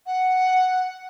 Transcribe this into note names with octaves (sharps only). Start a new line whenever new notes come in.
F#5